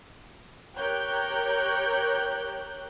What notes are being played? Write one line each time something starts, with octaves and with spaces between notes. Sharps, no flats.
G4 A#4 C#5 F#6 G6